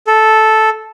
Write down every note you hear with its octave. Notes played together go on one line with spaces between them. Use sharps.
A4